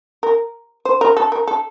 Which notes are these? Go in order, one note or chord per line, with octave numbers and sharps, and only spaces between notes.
A#4
C5
A#4
A4
A#4
A4